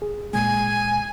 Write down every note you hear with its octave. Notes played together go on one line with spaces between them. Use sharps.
G#4
A#2 G#3 G#5